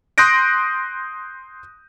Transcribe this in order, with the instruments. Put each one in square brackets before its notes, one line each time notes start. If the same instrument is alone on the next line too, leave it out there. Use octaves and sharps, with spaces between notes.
[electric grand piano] C6 D#6 F#6 G6 A#6 D7